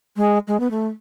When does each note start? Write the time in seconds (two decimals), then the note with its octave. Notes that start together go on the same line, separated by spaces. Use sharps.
0.16 G#3
0.47 G#3
0.60 B3
0.71 A3